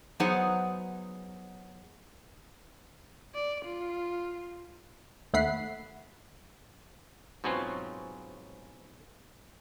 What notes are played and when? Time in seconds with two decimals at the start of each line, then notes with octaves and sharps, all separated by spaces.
0.20 F#3 B3 D#4 G#4 C5 F#5
3.35 D5
3.65 F4
5.33 D#2 A3 F#5 B5 C7
7.44 G#2 B2 F#3 C4 C#4 F4